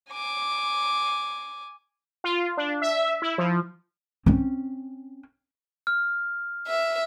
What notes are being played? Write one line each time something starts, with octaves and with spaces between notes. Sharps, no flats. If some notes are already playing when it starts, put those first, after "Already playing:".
G#5 D6
F4
D4
E5
E4
F3
C4 C#4
F6
E5